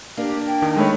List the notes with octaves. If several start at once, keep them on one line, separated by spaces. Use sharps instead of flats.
A#3 D4 G4
G5
D#3
G#3 A3 C#5 B5